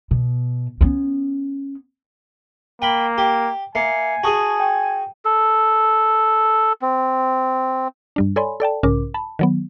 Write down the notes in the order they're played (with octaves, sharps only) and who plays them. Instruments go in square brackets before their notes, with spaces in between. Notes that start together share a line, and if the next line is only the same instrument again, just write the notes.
[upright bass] B2
B3 C#4
[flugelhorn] A#3 [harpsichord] G5 B5
[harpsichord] G4
[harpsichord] A#3 [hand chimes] E5 C7 C#7 [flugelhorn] G#5
[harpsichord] F#4 G#4 [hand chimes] A5 C#6 D#6
[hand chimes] G5
[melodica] A4
C4
[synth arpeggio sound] G2 G3 D4
A4 C#5 D5 G#5 B5 C6
A4 D5 G5 A5
B1 G#2 C#3 C#4 A#4 D6
A5 B5
D#3 F#3 B3